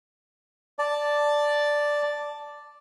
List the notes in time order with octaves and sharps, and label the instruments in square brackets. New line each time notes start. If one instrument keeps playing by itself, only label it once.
[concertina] D5 A5